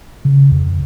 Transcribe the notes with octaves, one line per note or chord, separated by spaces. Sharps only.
C#3
F2